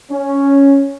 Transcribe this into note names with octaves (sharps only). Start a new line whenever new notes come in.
C#4